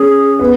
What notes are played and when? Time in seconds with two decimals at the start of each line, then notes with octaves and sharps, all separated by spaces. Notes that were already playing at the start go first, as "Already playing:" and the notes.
Already playing: C#4 G#4
0.39 B3